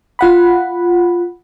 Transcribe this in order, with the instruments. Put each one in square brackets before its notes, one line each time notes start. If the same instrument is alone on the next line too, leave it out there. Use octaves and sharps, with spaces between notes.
[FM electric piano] F4 F#5 B5